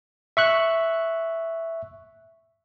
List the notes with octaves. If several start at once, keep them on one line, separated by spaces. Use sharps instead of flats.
E5 C#6 F#6